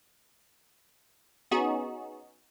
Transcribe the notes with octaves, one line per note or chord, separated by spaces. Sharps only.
B3 C#4 D#4 F#4 G#4